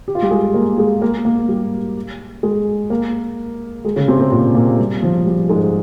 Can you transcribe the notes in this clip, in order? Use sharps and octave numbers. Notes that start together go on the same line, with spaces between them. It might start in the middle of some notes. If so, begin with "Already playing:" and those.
G4
F4
G3 G4
G#3 G#4
A#3 A#4
G#3 G#4
A#3 A#4
A#3 A#4
G3 G4
G#3 G#4
A#3 A#4
G#3 G#4
C#3 C#4
C3 C4
C3 C4
A#2 A#3
A#2 A#3
G3
F3
G3
G#2 G#3